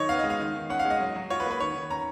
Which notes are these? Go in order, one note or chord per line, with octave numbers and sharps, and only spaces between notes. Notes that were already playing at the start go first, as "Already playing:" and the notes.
Already playing: D#3 F#3 D#4 C#5 D#5
B3 F5
D#5
G#3
F5
D#3
D#3
C#4 F#5
F5
G#3
D#5
F#3
F#3
F4 C#5
B4
A#3
B4
D#3 C#5
D#3
C#4 A#5